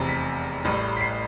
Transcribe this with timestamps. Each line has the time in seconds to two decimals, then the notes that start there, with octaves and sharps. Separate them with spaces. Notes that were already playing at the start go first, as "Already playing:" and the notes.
Already playing: F1 E2 C3
0.09 B6
0.65 A1 A2 G3
0.97 B6
1.01 C7